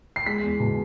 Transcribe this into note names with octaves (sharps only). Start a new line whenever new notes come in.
C7
G#3 B6
E2
B2